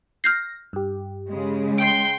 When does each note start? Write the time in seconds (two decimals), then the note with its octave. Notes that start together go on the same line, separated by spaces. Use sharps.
0.24 F6 G6 A#6 C7
0.73 G2 G4
1.30 C#3 G#3
1.78 G5 C6 D7